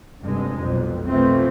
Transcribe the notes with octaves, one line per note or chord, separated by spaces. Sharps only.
F1 G2 C3 G#3
B1 F2
B2 E3 F3 A3 C4